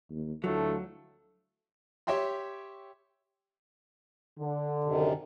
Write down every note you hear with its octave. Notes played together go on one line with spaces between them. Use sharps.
D#2
D2 F#3 A3 E4 F4 A4
G4 C#5 E5 G5 C6
D3
F#2 C3 D#3